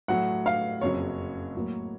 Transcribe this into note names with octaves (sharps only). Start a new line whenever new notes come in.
A2 F#3 A3 F#5
F5
F#1 F2 C#3 F#3 C#5
A2 F#3 A#3